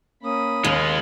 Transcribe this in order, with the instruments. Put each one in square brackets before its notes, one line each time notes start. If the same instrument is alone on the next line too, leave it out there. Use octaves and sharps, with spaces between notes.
[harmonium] A#3 C#4 [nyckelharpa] B5 D#6
[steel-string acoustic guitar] D#2 [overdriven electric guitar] G#3 F4